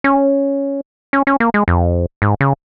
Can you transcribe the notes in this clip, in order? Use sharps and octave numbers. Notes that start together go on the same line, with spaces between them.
C#4
C#4
C#4
A#3
G#3
F2
G#2
C#3